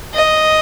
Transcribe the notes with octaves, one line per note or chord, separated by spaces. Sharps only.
D#5